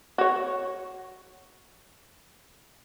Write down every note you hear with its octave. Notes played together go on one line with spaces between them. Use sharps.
F#4 C#5